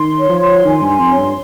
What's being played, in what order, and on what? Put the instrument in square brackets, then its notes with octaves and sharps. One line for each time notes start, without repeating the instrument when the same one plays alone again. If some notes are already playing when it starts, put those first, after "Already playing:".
Already playing: [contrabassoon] D#3 [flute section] C6
[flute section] C#5
[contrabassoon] F3
[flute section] C6
[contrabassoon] D#3 [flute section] G#5
[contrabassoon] G2
[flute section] C6
[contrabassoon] F2
[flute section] C#5
[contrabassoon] G2